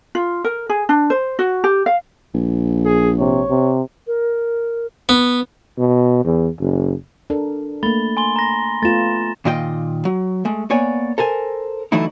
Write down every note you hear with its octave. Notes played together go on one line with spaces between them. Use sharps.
F4
A#4
G#4
D4
C5
F#4
G4
F5
A#1
G#4
C3 C#5
C3
A#4
B3
B2
E2
F#1
D4 A4 A#4
A3 A#3 B5 A6 G7
G#5 C6 G7
A#5 A#6
A3 B3 F4 A6 E7
A#2 D#3 F4 D#5 G5
F#3
G#3 A3
A#3 B3 C#5 D5 G#5
A4 A#4 C5 G#5
D3 E3 F#3 A3 D#4 E4